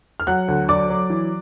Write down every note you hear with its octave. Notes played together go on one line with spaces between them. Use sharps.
F6
F#3 F#5 F#6
D2
F#3 D5 D6
F#3
E3